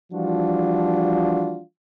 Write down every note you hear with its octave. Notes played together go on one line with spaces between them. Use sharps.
E3 F3 G3 D4 F4 F#4